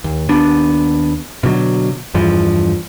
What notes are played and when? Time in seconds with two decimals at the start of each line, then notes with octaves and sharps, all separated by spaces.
0.04 D#2
0.29 D#2 B3 D4
1.43 B2 D3 F#3
2.14 E2 G2 E3 F3